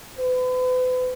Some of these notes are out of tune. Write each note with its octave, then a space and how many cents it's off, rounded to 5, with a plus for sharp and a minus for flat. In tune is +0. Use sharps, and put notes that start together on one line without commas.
B4 +40